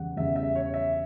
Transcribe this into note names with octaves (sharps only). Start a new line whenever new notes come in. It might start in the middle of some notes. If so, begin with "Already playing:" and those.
Already playing: E2 C#3 G3 F#5
E2 C#3 G3 E5
E5
C#5
E5